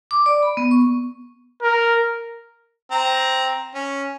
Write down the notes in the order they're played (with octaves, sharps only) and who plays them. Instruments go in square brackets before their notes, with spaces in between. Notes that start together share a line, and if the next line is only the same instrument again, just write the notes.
[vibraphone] D6
D5
B5
B3
C#6
[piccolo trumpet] A#4
[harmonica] C4 A#5
C#4